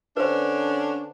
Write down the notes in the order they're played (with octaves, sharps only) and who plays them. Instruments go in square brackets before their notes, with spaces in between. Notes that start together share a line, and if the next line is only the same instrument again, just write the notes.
[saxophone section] D3 C#4 D4 [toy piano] B4 C5